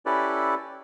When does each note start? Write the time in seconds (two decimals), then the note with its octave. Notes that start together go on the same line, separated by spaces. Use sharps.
0.06 C#4 E4 G4 A4 B4 D5